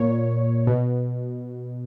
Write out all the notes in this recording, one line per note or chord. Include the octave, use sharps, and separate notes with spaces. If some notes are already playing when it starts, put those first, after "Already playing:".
Already playing: A#2 C#5
B2